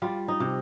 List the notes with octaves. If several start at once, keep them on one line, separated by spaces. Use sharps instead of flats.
G3 F4
D#4
C3